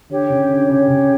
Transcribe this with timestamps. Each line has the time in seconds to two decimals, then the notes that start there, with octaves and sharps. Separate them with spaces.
0.09 D3 G4 C#5 G5
0.30 C#3
0.49 D3
0.68 C#3 G4 C#5 G5
0.88 C#3